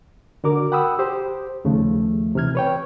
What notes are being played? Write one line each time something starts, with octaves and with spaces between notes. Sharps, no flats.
D3 F#4 A#4 D6
F#5 G5 B5 D#6 E6
G4 C5
D#2 C#3 F3 A3
C3 E3 F6 G#6
B4 C#5 G5